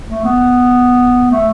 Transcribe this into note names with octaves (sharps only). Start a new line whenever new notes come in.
A3
B3
A3